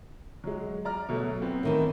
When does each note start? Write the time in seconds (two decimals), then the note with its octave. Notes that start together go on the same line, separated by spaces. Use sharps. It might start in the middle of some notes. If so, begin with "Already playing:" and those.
0.44 F#3 G#3
0.85 D5 A#5 F6
1.09 B2 F#3 A3
1.41 B3 C4
1.63 A2 D#3 E3